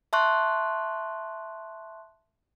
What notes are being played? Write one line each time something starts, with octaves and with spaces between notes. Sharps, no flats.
E5 A5 C6 C#6 F#6